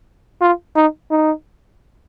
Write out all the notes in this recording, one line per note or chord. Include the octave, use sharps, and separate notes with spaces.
F4
D#4
D#4